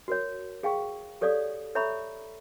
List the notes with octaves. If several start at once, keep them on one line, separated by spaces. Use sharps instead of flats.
F#4 A#4 C#5
G#4 F5 G5 C#6
G4 A4 C#5 D5 F5 D#6
A4 C#5 E5 A#5 B5 C#6